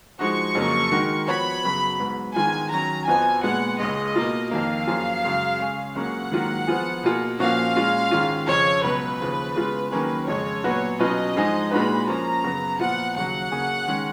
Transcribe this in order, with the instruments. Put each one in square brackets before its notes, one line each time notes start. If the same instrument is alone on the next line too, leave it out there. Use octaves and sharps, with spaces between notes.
[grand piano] F3 G#3 D#4 F#4 [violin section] C#6
[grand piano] F2 C#3 F#3 A#3
D#3 G#3 D#4 F#4 A#4
[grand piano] F3 B3 F#4 C#5 [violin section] B5
[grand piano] F#2 C#3 F#3 B3
G#2 F#3 B3
[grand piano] G#2 D#3 G#3 B3 F4 [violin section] G#5
[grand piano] D#3 F#3 C#4 [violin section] A#5
[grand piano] F2 F3 B3 F#4 [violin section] G#5
[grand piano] A#2 G#3 B3 [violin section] F#5
[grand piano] C#2 C#3 G#3 [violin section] D#5
[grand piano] B2 A#3 F4
[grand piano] F2 D#3 A#3 [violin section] F5
[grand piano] F#2 F3 A#3 F4 G#4
F#2 C#3 G#3
C#3 G#3 C#4 G#4
[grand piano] C#2 C#3 F#3 A#3 C#4 [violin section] F#5
[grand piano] G#2 D#3 F#3 A#3 F4
F3 B3 F4 G#4
B2 A#3 F4 G#4
[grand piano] A#2 F3 A#3 C#4 F#4 [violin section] F5
[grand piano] A#2 G#3 C#4 F4
G#2 D#3 G#3 C#4 F4
[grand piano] F2 C#3 F3 [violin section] C#5
[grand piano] C#2 B2 F#3 B3 [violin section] B4
[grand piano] D#2 C#3 F3
C#3 G#3 B3 F4
[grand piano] D#3 F#3 A#3 C#4 G#4 [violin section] B4
[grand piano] F2 C#3 G#3 [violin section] C#5
[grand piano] A#2 F#3 B3 F#4 B4
[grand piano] B2 F#3 C#4 F4 B4 [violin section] D#5
[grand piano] G#2 F3 G#3 D#4 G#4
[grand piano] A#2 G#3 D#4 F#4 B4 [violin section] B5
[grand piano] F3 A#3 C#4 [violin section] A#5
[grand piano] F#2 C#3 F#3 B3
[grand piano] A#2 F3 B3 F4 [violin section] F#5
[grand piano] D#2 C#3 F#3 [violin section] F#5
[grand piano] C#3 F#3 A#3 C#4 G#4
D#3 G#3 C#4